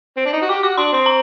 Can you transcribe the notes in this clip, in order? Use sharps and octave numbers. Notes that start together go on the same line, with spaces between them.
C4
D4
D#4
F#4
G4 D6
F#4 D6
D4 C6
C4 C6
A#5